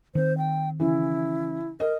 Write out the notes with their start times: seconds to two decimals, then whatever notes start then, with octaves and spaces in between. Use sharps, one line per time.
0.15 D#3 C4 C5
0.38 G5
0.80 C#3 E3 E4
1.80 A#4 D#5